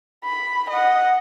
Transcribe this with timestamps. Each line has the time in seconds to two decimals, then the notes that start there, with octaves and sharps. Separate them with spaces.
0.24 B5
0.70 D#5 F#5